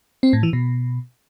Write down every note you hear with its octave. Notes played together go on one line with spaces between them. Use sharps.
C4
A2
E3
B2